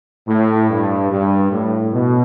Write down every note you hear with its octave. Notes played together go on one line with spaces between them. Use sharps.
A2
G2
G2
A2
B2